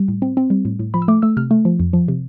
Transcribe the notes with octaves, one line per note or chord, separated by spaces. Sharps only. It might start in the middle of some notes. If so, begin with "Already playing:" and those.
Already playing: G3
A2
C4
C4
G3
A2
A2
F3 B5
E6
A3 D6
A3 E6
C3 F6
A3
F3
F2
F3
C3